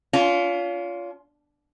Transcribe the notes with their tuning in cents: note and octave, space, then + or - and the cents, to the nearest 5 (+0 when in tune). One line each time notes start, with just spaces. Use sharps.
C#4 +45 F4 +0